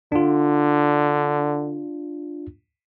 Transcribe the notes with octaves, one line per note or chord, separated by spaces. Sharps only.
D3 D4 F4